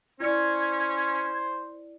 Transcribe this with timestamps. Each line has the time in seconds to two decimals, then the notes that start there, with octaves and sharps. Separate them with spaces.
0.20 C#4 E4 C5 D5 G#6 C#7